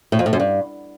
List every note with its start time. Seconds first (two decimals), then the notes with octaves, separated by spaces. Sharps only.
0.12 A2
0.19 F2
0.26 A2
0.33 F#2
0.40 G2